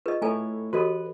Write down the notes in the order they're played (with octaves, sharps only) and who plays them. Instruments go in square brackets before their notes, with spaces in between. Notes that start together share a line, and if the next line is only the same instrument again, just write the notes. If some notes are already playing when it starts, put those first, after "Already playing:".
[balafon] F4 G#4 [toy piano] B4 D#5
[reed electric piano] A3 E4 C#5 [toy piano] A4 G#5 A#5
[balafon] E3 G4 [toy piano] F#4 A4 D#5 [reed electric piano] B4